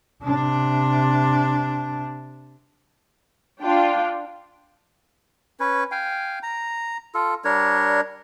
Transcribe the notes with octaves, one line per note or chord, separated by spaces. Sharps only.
C3 D4
D4 F4 G5
C#4 B4
F5 G5 G#5
A#5
F4 A4
G3 D4 A#4 C#5